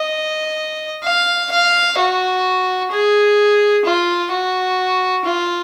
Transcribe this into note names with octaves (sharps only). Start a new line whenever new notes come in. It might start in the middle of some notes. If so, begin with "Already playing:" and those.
Already playing: D#5
F5
F5
F#4
G#4
F4
F#4
F4